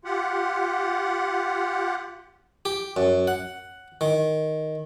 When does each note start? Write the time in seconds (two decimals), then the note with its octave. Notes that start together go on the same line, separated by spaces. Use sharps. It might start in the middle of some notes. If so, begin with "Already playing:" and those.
0.05 F4 G4 F#5
2.65 G4
2.97 F#2
3.27 F#5
4.01 D#3